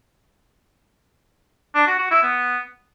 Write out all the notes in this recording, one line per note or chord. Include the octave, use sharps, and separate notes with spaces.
D4
F#4
F#4
E4
B3